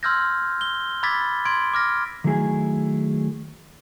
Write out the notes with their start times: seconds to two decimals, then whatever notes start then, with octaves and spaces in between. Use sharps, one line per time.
0.03 C6 E6 F6 G6 G#6 A#6
0.61 G7
1.03 B5 D6 E6 G#6 A6 B6
1.45 C6 G#6 D7
1.74 D6 F6 A#6
2.24 D#3 F#3 A3 E4 G#4